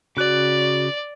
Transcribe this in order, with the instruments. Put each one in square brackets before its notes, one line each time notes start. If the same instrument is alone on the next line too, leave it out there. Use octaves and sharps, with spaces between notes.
[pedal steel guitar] C#3 F#6 [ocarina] F#4 [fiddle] D5